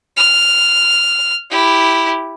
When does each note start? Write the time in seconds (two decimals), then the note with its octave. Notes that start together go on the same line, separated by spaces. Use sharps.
0.17 F6
1.51 E4 G4